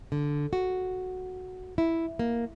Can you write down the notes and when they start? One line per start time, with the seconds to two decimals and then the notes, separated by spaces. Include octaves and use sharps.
0.12 D3
0.53 F#4
1.78 E4
2.19 A#3